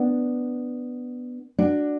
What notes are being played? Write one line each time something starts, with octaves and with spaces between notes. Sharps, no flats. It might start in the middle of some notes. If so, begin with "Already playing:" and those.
Already playing: B3 D4
D4 F#4